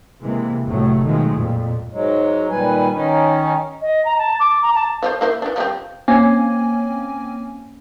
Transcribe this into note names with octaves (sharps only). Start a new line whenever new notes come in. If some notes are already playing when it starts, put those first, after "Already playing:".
C3 E3 G#3 A#3
F1 A2 F#3 A3
B2 D#3 F3 F#3 G#3 A3
F2 A#2
G#2 F#3 G#3
A#2 D#3 G3 B4 G#5
D#3 C#4 D#4
D#5
A#5
A5
D6
A#5
A5
F3 E4 C5
A#3 E4 C5
E3 D4
F3 G3 C4
A#3 C4 C#4 G#5